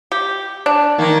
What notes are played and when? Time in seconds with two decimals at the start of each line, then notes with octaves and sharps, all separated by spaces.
0.12 G4
0.66 D4
0.98 D#3 A#3